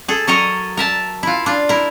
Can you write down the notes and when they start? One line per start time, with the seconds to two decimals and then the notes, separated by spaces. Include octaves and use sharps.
0.08 G#4 A4
0.27 F#3 A4 A#4 C#5 D#5 A#5
0.77 A#4 E5 A5
1.23 E4 F4
1.46 D4 F4
1.69 E4 A#4